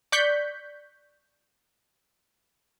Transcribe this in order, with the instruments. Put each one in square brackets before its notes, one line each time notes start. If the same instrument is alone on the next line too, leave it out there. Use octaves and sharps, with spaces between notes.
[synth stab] D5 C#6 F#6 G6 B6